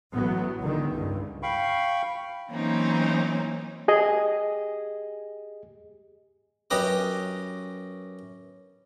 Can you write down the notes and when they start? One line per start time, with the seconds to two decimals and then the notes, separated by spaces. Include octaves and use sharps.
0.12 A1 A2 F#3 B3
0.61 C#2 D3 D#3
0.92 C#2 G2
1.43 F5 G5 B5 C#6
2.50 E3 F#3 A#3 C4 C#4 D#4
3.88 G4 G#4 D#5
6.70 F#2 C#4 G4 B4 D#5 D6